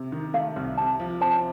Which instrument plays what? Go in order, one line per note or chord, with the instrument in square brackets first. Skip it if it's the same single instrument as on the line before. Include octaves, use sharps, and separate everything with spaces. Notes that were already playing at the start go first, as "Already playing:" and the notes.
Already playing: [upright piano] C3
D#3
[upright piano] A3 [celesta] F5
[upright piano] C2
[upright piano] C3 [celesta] A5
[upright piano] F3
[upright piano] C4 [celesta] A5